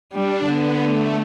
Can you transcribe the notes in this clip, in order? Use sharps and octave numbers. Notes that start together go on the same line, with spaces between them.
G3 D4
D3 B3
A3